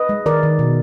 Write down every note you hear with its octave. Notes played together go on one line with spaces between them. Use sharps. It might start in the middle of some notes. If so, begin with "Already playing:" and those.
Already playing: B4 D#5
G#3
D#3 A#4 D5
D#3
B2